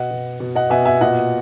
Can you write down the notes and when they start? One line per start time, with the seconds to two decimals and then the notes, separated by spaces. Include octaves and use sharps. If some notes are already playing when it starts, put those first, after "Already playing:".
Already playing: B2 D#5 F#5
0.11 B2
0.40 B2
0.55 D#5 F#5
0.70 B2 E5 G#5
0.85 E5 G#5
1.01 A#2 D#5 F#5